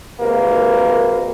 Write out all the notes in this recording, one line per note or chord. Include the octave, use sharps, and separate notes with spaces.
G#1 C3 A#3 B4